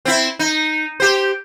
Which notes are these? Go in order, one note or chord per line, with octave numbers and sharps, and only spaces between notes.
C4 E4
D#4
G4 C5